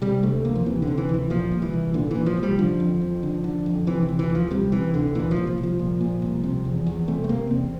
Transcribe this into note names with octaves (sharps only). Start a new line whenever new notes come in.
C3 G3
D2 A3
D2 A#3
F3
C3 E3
D3
C3
E3
D2 E3
A#2 F3
C2
E3
C2
A#2 D3
A#2 E3
F3
C2
G3
D3 F3
F2
F2
D3
D3
F2
C3 E3
E3
D2
E3
D2
F3
C3 G3
C3 E3
D2 D3
A#2 E3
F3
C2
F3
C2
F3
A#2
A#2
C2
C3
E2
E2
C3 A3
A3
C3 A#3
E2 C4